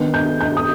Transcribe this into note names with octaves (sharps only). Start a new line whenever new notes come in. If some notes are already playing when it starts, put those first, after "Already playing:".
Already playing: D#3 B3 D4
G6
G6
D#6